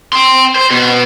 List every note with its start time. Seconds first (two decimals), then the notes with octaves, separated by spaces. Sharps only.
0.13 G5 C6
0.55 C5
0.71 B2 B3